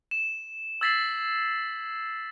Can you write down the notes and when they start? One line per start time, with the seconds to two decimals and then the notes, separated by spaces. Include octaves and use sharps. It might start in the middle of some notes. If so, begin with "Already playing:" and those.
0.11 E7
0.81 E6 G#6 A6 B6 C7 F#7